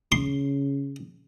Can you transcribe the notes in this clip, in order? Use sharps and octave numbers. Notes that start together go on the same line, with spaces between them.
C#3 C6